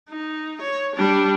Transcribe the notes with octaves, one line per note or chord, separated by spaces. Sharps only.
D#4
C#5
G3 D4